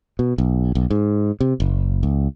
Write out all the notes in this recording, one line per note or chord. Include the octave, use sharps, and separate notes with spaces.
B2
B1
B1
G#2
C3
F#1
C#2